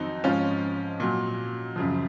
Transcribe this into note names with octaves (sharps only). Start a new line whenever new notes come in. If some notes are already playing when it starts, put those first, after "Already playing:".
Already playing: F2 D#3 F#3 C4 D#4
G#2 F3 C#4 F4
A#2 F#3
F#2 C#3 F3